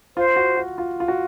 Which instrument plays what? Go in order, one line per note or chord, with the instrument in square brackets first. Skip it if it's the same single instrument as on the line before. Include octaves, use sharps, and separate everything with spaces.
[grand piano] F4 [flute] C5
[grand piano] F#4
F#4
F4
F4
F#4